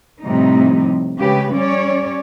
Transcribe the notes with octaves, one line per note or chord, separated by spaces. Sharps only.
A2 C3 F3 G3 A3 D#4
C#3 G#3 G4 B4
G3 C#4 C#5 D5